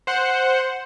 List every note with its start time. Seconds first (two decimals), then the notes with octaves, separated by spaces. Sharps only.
0.07 C5 F#5